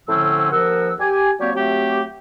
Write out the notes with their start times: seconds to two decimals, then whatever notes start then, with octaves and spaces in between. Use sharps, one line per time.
0.08 A2 D3 F3 C4 C#4 E6
0.51 D#2 F3 A#4 F#5 E6
0.99 G4 G#5
1.39 F#3 A#3 C4 G4 C#5 D5
1.55 F#3 A3 C4 G4